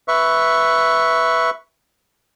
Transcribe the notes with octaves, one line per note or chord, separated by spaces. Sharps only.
B4 E5 C#6